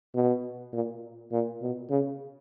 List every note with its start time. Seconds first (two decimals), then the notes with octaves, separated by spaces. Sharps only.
0.15 B2
0.73 A#2
1.32 A#2
1.62 B2
1.90 C#3